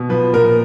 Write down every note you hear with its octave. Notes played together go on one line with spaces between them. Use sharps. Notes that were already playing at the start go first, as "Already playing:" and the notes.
Already playing: B2
F3 B4
A#2 A#4